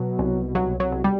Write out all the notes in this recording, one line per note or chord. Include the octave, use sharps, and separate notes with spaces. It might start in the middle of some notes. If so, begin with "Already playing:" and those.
Already playing: B2 F#3
C2
B1 F#3
F#3
B1
G3